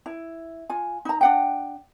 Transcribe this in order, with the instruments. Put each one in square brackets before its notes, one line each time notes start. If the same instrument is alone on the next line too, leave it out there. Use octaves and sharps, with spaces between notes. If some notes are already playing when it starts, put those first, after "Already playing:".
[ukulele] E4
F4 G#5
D#4 A#5
D4 F#5 G5